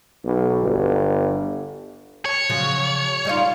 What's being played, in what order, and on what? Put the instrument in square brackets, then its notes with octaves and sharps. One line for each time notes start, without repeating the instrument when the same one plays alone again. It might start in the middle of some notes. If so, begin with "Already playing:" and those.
[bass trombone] B1
G1
[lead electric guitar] C#5
[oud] C#3 F3 F#3
G3 D#4 F4